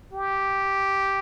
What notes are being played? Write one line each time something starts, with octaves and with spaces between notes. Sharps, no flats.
G4